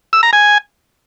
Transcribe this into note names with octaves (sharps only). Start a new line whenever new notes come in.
E6
A#5
G#5